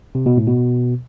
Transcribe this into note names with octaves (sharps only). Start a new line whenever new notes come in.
C3
B2
A2
B2